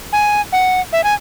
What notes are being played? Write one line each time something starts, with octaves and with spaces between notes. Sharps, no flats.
G#5
F#5
E5
G#5